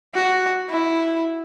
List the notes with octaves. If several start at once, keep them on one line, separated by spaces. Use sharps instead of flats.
F#4
E4